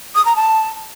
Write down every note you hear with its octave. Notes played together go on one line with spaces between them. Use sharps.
D#6
A#5
A5